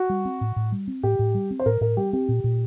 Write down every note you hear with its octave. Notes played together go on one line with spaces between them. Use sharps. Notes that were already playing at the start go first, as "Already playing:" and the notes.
Already playing: F#4
G3
C4
A2
A2
G3
C4
A2 G4
A2
G3
C4
C5
A2 A#4
A2 A#4
G3 G4
C4 G4
A#2
A#2